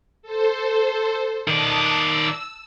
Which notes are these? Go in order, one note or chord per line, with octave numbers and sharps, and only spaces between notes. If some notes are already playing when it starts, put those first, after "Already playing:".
A4 C5
D#3 D5 A5 D#6 F#6
E6